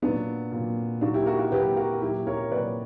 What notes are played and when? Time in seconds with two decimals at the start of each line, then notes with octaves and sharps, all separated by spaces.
0.02 A#2 F#3 B3 D4
0.52 A#2 F#3
1.01 A#2 F#3 D4 F#4
1.14 E4 G4
1.26 F#4 A#4
1.39 F#4 A#4
1.51 A#2 F#3 G4 B4
1.77 F#4 A#4
2.01 A#2 F#3 E4 G4
2.27 A#4 C#5
2.51 A#2 F#3 B4 D5